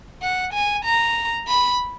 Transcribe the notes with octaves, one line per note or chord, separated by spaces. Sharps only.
F#5
G#5
A#5
B5